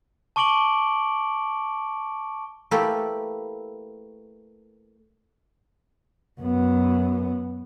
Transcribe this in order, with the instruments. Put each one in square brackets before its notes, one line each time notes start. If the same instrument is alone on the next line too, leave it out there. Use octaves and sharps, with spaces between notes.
[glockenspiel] A5 C#6 D6 D7 F#7 G7
[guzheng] A3 A#3 E4 G4 A4 B4
[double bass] F#2 B3